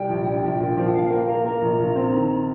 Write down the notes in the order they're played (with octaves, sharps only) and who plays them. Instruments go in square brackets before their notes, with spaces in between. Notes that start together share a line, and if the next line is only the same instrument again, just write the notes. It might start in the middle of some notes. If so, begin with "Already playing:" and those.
Already playing: [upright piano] C2 G3 [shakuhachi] G5
[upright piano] A#1
G3
[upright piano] A#1 [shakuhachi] G5
[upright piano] A#2
F3
[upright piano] F3 [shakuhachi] F5
[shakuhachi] F5
[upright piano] A#3 [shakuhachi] G5
[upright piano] A#3 [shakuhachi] A#5
[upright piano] A#3 [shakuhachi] A#5
[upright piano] A#1
A#1
C4
D#3